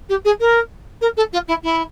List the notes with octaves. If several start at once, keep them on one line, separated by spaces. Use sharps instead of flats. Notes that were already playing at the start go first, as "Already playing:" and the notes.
G4
G#4
A#4
A#4
A4
F4
E4
E4